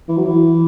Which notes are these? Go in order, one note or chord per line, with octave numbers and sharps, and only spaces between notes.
E3
F#3
E3